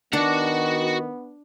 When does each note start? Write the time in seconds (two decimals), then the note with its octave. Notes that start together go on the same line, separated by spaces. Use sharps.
0.13 D#3 B3 D4 F#4 F#5